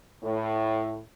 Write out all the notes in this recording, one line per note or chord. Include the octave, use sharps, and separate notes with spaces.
A2